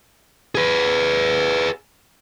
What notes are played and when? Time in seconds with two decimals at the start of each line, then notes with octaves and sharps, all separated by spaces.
0.55 G#4 B4